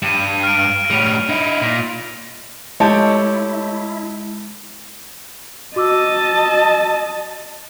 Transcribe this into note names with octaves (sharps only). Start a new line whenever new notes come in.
G2 D#7 E7
F6 D7
A2 G3 D7 D#7 F7
D#4 E4
A#2
G#3 A3 E4 G4 C#5 D#5 A5
F#4 D#5 A5 D6 E6